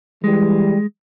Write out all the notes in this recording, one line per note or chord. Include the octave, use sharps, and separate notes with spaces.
E3 G3 G#3